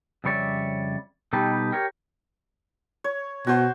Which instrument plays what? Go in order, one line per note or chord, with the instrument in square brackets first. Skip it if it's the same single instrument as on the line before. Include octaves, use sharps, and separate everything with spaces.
[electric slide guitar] F2 C#3 G3 C#5 D5 E5
B2 G3 D#4 G4 A4 B4
G4 A#4 C#5
[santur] C#5
[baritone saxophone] B2 [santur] F#4 C5